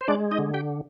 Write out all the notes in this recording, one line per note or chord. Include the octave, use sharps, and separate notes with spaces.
C5
G#3 D4 D5
D#4 D#5
D3
G4 G5